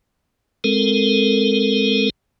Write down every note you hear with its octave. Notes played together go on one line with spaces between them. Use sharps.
G#3 C4 A4 A#4